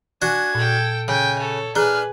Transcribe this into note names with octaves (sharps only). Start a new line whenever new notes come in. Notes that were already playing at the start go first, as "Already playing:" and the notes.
D4 F#4 G#5 G#6
A#2 A4 G5
C#3 G5 G#5
A4 C#5
D4 G#4 B4 G#5 A#5 F6